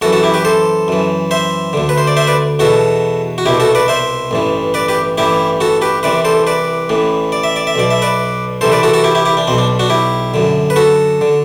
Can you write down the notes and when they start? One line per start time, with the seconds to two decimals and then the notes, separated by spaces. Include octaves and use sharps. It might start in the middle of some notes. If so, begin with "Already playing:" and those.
0.02 F#2 E3 F#4 A4
0.12 F#4 A4
0.23 E4 G4
0.34 G4 B4
0.45 A4 C5
0.88 F#2 E3
1.31 C5 E5
1.73 D2 D3
1.89 B4
1.98 C5
2.07 D5
2.17 C5 E5
2.27 B4 D5
2.59 E2 B2 F#4 A4
3.38 F#4
3.46 C2 B2 E4 G4
3.60 F#4 A4
3.75 B4 D5
3.88 C5 E5
4.31 A1 G2 E3
4.74 B4 D5
4.88 G4 B4
5.18 A1 G2 E3 E4 G4
5.61 F#4 A4
5.82 G4 B4
6.03 C2 C3 E3 B4 D5
6.25 A4 C5
6.47 B4 D5
6.89 A1 A2 E3
7.32 D5
7.43 E5
7.56 D5
7.67 E5
7.76 B1 B2 D5
7.90 E5
8.02 B4 D5
8.61 C2 C3 E3 A4 C5
8.72 B4 D5
8.83 F#4 A4
8.94 F#4 A4
9.04 E4 G4
9.15 E4 G4
9.25 E4 G4
9.37 D4
9.47 B1 B2 C4
9.58 D4
9.79 D4 F#4
9.90 E4 G4
10.34 F#2 D3
10.70 B4
10.76 F#4 A4
11.21 D3